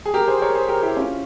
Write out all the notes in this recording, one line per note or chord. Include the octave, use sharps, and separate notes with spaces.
G#4
G4 A#4
G#4 C5
A#4 C#5
G#4 C5
G4 A#4
E4 G4
C#4 F4